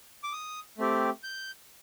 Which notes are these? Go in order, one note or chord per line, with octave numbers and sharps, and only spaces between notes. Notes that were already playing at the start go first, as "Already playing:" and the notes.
D6
D#6
A3 C4 G4
G6